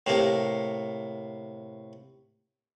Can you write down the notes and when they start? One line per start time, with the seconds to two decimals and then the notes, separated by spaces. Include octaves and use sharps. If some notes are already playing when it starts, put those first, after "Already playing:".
0.06 A2 C3 A#3